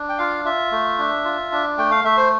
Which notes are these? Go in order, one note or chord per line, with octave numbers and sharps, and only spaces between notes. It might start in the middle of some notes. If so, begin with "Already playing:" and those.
Already playing: D4
G5
F4 F5
F4 E5
A3
D4
F4
D4
A3 G5
F5
A3 E5
C5